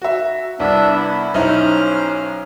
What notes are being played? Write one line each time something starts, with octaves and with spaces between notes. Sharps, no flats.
F#4 E5
C2 B3 D4 E5
B3 E4
B1 C#4 D#4 E4 C5 F6